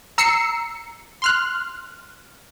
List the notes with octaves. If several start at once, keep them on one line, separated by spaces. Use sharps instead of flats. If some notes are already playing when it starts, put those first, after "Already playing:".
A#5 E6 C7 C#7
C6 F6 F#6